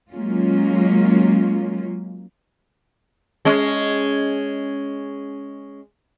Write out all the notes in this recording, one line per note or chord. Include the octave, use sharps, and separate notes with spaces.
F#3 G#3 A#3 C#4 F4
G#3 C#4